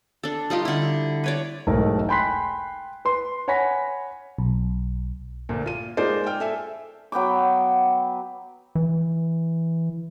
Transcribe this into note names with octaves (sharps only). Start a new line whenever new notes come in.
D4 A4
G3 D#4 F4 G4
D3 E4
B4 C#5 D5
E1 B1 G#2 A3 A#4
G5 G#5 B5 C6 F#6 B6
B4 C6
C#5 F#5 G#5 B5 A#6 B6
B1
D2 A#2
F4 D#7
G#3 A#3 D#4 F4 C5 D5
G5 F6
A4 E5 G#5
F#3 B3 G5 D6
E3